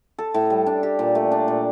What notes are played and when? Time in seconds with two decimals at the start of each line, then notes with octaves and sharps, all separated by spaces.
0.18 A4
0.34 A2
0.50 G3
0.66 D4
0.83 G4
0.99 A#2
1.15 A3
1.32 D4
1.48 A#2